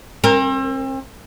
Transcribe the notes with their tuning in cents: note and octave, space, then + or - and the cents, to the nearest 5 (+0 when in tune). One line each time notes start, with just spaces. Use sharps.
C4 +40 A#4 +0